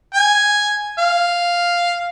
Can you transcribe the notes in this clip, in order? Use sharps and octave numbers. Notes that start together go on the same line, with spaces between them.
G#5
F5